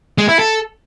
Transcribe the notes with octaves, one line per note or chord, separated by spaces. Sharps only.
G#3
E4
A4